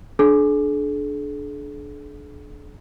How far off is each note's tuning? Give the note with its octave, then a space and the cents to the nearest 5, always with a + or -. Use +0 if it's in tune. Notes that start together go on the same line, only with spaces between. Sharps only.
D4 +0 G#4 +45